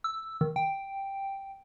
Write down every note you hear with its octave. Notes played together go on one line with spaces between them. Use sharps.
E6
D#3
G5